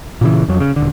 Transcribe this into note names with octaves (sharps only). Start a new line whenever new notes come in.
A#2 C#3 E3
F2 F#3
C#3
D#1 D3